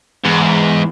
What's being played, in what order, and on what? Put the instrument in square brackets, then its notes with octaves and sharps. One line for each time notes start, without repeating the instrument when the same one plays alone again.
[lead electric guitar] E2 [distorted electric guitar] G#2